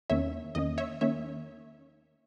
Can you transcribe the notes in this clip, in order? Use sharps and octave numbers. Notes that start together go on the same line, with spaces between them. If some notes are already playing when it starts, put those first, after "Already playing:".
E2 D#3 A#3 C#4 C#5 E5
E2 D#3 A#3 C#4 D#5
C#5 E5
D#3 A#3 C#4 C#5 E5